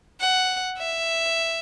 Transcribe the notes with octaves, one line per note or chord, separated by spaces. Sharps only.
F#5
E5